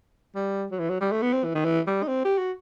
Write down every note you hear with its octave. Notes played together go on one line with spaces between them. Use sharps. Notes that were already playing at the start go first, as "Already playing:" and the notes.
G3
F#3
E3
F#3
G3
A3
B3
C4
E3
D#3
E3
G3
D#4
C4
G4
F#4